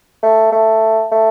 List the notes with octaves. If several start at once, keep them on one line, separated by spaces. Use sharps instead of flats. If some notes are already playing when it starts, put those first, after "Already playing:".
A3
A3
A3